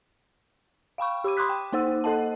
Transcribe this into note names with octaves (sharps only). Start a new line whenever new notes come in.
F5 G5 B5 C#6
G4 B5 D6 D#7
B5 C6 D6 D#6 F#6 B6
G5
A#3 D#4 C5 F#5 E6
A4 C5 D#5 F#5 A5